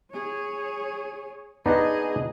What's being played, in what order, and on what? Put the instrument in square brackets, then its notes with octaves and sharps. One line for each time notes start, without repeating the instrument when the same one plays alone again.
[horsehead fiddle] G#4 C#5
[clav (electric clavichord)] B3 D4 D#4 [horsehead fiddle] G#4 D#5